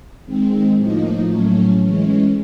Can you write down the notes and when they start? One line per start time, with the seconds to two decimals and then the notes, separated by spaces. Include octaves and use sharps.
0.25 D#3 G#3 C4
0.76 A2 F3 A#3 D#4
1.27 A2 F#3 A3 C#4
1.80 E3 G#3 C#4